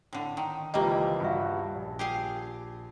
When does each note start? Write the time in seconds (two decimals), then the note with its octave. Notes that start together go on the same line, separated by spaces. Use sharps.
0.13 A2 D3
0.37 D#3
0.74 C#2 E3 F3 G3 A#3 F4 G4 D#5
1.20 G2 C#4 F#4 E5
1.75 A#1
1.99 G4 G#4 F5